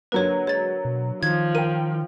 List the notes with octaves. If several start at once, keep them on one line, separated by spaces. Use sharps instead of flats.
D3 F#3 A#3 B4 C#5
G#3 C#5 A6
B2
D#3 F3 G#6
A#4 G5 D#7